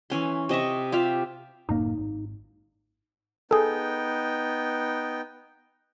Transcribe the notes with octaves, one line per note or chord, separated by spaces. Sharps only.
E3 C#4 C6
C3 D#5 E5 C#6
F4 G4 E5 F5
F#1 A2 A#3 D#4
G#1
B3 D#4 G#4 A4 G5